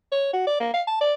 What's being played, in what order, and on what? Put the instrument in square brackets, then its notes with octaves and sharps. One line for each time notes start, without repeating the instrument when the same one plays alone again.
[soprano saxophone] C#5
F#4
D5
A#3
F5
A5
D5